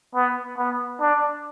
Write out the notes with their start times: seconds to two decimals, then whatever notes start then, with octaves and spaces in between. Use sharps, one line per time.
0.14 B3
0.57 B3
1.00 D4